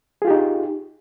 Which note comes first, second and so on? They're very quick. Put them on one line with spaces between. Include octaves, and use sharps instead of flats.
G#4 F4 G4 D#4